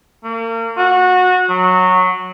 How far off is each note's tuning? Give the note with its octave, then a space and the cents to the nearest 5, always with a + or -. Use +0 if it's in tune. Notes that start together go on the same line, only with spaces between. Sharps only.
A#3 -35
F#4 -20
F#3 -10